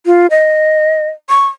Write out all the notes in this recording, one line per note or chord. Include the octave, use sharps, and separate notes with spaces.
F4
D#5
C#6